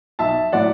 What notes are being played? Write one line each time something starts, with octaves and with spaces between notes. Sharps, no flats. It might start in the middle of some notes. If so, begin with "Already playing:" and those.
B1 E5 A5
A2 F#3 D5 F#5